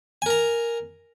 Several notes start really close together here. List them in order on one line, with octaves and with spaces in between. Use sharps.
G#5 A#4 A#5